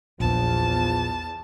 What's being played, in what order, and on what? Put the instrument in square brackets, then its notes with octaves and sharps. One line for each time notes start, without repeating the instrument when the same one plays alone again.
[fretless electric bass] A#1 [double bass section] E2 [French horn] F3 [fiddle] A5